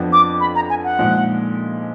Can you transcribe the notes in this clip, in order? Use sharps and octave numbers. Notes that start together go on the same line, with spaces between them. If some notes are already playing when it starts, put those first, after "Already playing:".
Already playing: F2 F3 B3 D4
D6
B5
A#5
G#5
F#5
A#2 F3 G#3 D#4